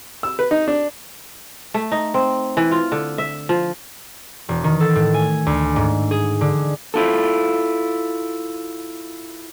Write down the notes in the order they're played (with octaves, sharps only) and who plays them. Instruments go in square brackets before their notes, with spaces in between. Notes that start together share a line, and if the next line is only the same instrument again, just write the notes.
[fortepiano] E6
B4
D#4
D4
[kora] A3
D#4
C4
E3
F4
D3
E5
F3
[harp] E1
D#3
A4
A2
G#5
D2
G#2
G#4
D3
[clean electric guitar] E4 F4 A4